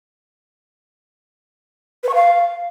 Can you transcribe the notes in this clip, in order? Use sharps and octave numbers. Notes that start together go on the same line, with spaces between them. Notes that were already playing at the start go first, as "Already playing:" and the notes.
B4
C#6
F5